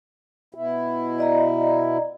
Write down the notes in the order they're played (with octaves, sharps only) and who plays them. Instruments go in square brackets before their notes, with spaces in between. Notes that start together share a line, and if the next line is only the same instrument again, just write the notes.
[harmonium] B2 E4
[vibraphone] D5 D#5 A#5